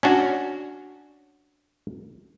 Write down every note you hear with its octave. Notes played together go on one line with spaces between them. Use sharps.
C#4 D4 F#4